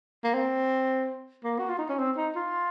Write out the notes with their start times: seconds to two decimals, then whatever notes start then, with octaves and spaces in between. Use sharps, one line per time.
0.24 A#3
0.34 C4
1.44 A#3
1.59 F#4
1.69 F4
1.79 D#4
1.89 C#4
1.99 C4
2.17 D#4
2.35 F4